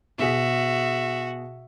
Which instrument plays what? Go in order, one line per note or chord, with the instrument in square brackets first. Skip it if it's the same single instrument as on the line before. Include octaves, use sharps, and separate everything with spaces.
[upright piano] B2 G#4 B6 [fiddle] F#4 [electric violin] E5